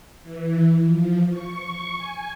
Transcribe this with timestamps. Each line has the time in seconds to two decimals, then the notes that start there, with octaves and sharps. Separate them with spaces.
0.22 E3
0.85 F3
1.30 C#6
1.97 G#5